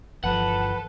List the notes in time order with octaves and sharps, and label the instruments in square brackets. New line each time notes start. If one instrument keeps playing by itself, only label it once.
[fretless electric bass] G1 E3 F3 [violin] A4 [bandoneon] B4 [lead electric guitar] F#5